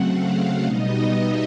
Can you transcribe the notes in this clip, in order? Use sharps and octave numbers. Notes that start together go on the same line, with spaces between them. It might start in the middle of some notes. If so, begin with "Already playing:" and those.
Already playing: C#3 F#3 A3 C4 F#5
F5
B2 G3 B3 D#4 D#5
E5